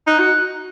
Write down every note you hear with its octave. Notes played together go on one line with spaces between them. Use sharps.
D#4 F#6
F#4